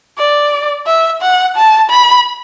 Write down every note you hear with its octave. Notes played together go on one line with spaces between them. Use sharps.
D5
E5
F#5
A5
B5